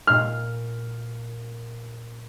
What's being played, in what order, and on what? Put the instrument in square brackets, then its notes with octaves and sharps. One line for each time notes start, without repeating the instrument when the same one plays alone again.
[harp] A#2 C7 [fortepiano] F6